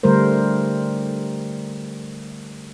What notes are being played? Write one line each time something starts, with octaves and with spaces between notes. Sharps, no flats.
D3 G3 A3 A#4 C5